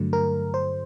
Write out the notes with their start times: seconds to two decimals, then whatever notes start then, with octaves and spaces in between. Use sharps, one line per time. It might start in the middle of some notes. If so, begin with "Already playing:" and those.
Already playing: G2 D3 F#3 A3
0.13 A#4
0.54 C5